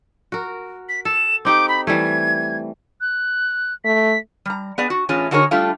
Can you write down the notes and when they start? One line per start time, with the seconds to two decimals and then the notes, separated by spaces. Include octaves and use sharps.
0.32 F#4 A#4
0.89 B6
1.05 A4 E7
1.45 C4 D#4 G4 D6
1.68 B5
1.87 E3 G3 A3 G#6
3.01 F#6
3.85 A3 B6
4.46 G3 A#5
4.78 B3 G#4 D5
4.90 F#4
5.09 A2 E3 C#4 F4 G#4
5.31 D3 D#4 F#4 G#4 A#4 C#5
5.51 G3 A3 D4 E4 F4